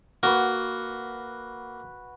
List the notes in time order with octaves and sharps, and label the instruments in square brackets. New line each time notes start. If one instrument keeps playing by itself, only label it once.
[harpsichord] A#3 [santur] F#4 B4